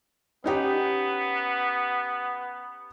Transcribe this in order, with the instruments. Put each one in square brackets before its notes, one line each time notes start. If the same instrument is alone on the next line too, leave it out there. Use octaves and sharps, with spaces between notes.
[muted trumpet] B3 [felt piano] C#4 D#4 G4